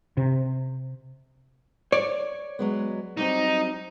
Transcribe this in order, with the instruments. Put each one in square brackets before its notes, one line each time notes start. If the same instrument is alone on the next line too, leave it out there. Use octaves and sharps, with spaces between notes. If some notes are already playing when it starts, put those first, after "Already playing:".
[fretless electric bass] C3
[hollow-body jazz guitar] C#5 [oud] D5
[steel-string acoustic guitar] F#3 G#3 B3
[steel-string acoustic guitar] F#3 G3 C4 [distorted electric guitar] D#4